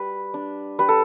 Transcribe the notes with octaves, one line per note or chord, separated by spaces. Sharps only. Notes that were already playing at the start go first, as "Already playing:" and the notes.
Already playing: G3 B4
D4
G3 B4
A4